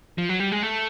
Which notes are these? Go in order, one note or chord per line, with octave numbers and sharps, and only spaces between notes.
F3
F#3
G3
G#3
A3